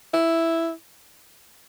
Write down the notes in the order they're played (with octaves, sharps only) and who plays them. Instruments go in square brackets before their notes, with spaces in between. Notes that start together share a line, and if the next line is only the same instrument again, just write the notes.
[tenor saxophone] E4